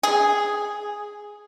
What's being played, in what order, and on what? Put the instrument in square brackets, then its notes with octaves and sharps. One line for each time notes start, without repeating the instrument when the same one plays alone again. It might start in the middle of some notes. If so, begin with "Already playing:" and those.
[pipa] G#4